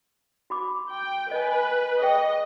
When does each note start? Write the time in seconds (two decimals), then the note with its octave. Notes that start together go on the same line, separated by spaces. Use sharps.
0.50 F#4 B5 D6
0.91 G5
1.31 B4 D#5 G#5
2.02 G#4 D5 D#5 G5